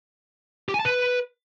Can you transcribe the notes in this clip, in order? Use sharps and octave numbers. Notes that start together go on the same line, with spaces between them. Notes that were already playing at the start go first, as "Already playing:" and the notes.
G4
G#5
A5
B4